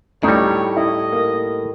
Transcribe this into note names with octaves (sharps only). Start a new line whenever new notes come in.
D2 A2 G3 D#4 C#5
E4 D#5
A#3